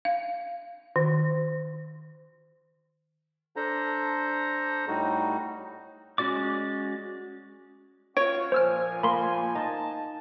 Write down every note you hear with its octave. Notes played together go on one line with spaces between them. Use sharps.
F5
D#3
D4 A4 C5 A#5
A2 G3 D#4 F#4
G#3 C#4 F#4 D5 D6
C#4 F4 F#4 C#5 D7
A#2 F3 C5 G#5 E6 F6
A#3 B5 C6
D#4 A5